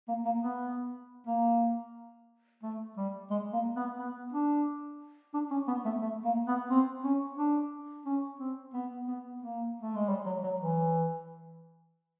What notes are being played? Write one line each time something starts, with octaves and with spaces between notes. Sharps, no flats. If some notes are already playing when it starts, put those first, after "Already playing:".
A#3
A#3
B3
A#3
A3
G3
G#3
A#3
B3
B3
D4
D4
C#4
B3
A3
A3
A#3
B3
C4
C#4
D4
C#4
C4
B3
B3
A#3
A3
G#3
G3
F#3
F#3
E3